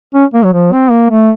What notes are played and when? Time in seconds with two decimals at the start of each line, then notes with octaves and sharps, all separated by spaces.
0.14 C#4
0.34 A#3
0.44 F#3
0.53 F3
0.72 C4
0.91 A#3
1.10 A3